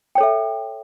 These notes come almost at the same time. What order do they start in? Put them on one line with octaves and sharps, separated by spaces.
G5 C#5 A4 E5